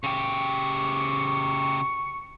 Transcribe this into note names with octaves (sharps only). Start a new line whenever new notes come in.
C#3 G4 C#6